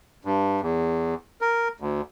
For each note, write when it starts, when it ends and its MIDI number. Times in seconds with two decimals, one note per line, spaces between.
0.25 0.61 43
0.61 1.14 40
1.41 1.68 70
1.80 2.01 38